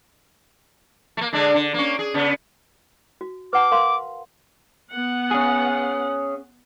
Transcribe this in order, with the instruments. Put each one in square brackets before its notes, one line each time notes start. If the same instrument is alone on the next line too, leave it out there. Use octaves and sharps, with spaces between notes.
[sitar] A3 A#3
D3 G#3 D4
D3
A#3 C#4
G#4
C#3 B3
[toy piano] F#4
[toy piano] B4 F#5 A5 [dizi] D6
[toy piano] A#4 F5 C6
[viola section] B3 F#5
[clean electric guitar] C#4 G#4